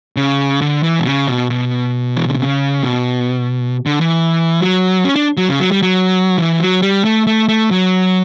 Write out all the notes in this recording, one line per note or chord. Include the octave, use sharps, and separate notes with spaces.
C#3
D3
E3
B2
C#3
B2
B2
E3
D3
C#3
B2
D3
E3
F#3
C#4
D4
F#3
C#3
F#3
G3
F#3
E3
F#3
G3
A3
A3
A3
F#3